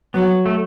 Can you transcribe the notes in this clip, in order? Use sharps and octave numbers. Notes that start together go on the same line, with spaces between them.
F#3 B3
A3